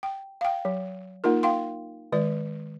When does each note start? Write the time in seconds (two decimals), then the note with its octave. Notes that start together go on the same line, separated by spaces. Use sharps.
0.03 G5
0.41 F5 G5
0.65 F#3
1.24 A#3 D#4 F4 A#4
1.43 F5 G5 C6
2.12 D#3 G#3 D5